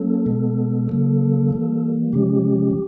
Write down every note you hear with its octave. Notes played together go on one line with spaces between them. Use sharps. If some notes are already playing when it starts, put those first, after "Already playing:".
Already playing: F#3 A#3 C#4 A4
B2 G#3 B3
C#3 F#3 A#3
E3 G3 A#3
C3 F3 G#3 C#4 G4